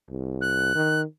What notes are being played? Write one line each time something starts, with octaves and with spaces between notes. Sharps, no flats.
C2
F#6
D#3